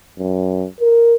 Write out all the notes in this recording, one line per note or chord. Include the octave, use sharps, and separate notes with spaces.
F#2
A#4